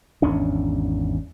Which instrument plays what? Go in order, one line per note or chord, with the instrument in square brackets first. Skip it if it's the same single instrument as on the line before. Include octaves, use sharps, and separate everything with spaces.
[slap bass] G#1 E2 C#4 D4